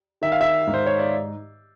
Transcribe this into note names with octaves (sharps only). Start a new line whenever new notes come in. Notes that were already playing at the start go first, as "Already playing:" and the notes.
D#3 E5
F5
E5
G#2
C5
C#5
D5